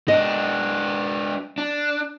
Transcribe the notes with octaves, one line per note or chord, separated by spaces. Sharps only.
G#3 D4 D#5
D4